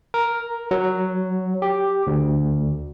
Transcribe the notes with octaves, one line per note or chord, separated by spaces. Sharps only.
A#4
F#3
G4
D2